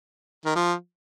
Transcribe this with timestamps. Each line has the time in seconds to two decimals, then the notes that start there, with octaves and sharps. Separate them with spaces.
0.45 D#3
0.56 F3